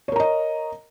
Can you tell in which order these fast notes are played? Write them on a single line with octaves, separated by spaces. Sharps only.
C#5 A#4 A#5 D#5